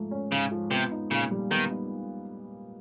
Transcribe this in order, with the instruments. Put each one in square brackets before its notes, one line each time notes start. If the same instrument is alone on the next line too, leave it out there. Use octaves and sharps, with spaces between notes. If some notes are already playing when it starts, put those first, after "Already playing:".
Already playing: [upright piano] G#2 F3 A3
C#4
[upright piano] G#2 [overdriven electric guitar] C#3
[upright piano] F3
[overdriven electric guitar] C3 [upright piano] B3
[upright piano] D#4
[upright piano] A#2 [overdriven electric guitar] C#3
[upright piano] G3
[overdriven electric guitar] D#3 [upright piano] B3
[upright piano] D#4